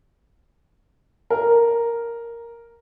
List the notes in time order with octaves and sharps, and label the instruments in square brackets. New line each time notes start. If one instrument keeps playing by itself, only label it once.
[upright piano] A#4